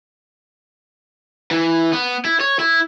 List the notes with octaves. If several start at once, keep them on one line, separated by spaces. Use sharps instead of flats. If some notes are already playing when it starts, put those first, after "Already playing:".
E3
B3
E4
C#5
E4